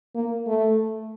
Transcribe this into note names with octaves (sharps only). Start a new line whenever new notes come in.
A#3
A3